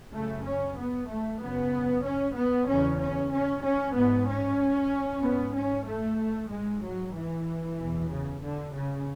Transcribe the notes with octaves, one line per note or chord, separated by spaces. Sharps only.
F#2 C#3 A3
C#4
B3
A3
F#2 C#3 B3
C#4
B3
E2 C#3 C#4
C#4
C#4
C#4
G#2 B3
C#4
G#2 B3
C#4
A3
G#2 G#3
F#3
E3
E2 B2
C#3
D3
C#3